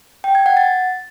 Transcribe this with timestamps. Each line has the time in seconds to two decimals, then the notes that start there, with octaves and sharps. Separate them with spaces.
0.24 G5
0.35 G#6
0.46 F#5
0.57 A6